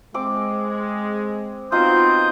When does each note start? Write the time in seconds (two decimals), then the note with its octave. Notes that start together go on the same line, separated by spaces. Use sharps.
0.14 G#3 C4 D6
1.72 B3 C4 D#4 F4 F#4 C6 D#6 G6